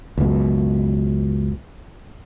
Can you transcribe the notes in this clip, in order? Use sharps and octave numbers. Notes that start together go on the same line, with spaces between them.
C#2 F#2 B2